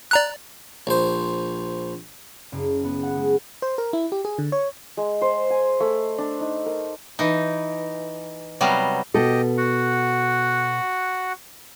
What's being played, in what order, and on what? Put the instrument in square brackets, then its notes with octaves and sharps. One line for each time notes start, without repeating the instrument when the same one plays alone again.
[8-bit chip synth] D5 A#5 F#6
[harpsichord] A#1 C5
[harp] F#1
B3
F#5
G#3
[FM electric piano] C5
A#4
E4
G4
G#4
D3
C#5
[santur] G#3
C5
G#5
A3
D4
D#4
A#4
[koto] E3 D#4
C3 F#3 G3 B3 D#5 F5
[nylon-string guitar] B2 A4 [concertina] G4 D#5
[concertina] F#4 F#5